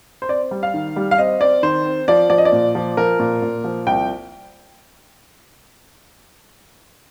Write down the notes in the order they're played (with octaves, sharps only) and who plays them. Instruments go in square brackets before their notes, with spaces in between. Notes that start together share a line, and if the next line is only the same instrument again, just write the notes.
[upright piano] C5
C4 D5
G3
F5
D#3
G3
F5
C4 D#5
C4 D5
D#3 C5
C4
F3 D5
F3 D5
D#5
D5
A#2
F3
F3 A#4
A#2
A#2
F3
C2 G5